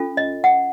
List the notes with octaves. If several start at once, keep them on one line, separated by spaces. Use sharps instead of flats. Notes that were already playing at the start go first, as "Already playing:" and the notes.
Already playing: C#4 F4 A4
D#5
F#5